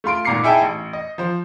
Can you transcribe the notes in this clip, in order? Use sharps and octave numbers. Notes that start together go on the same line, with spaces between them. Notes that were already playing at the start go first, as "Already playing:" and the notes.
A3 F4 C6 D7
G#1 A#2 A#5 D6 C7 C#7
D#4 E4 G#4 E5 G5 A5
A1
D#5
F3 C5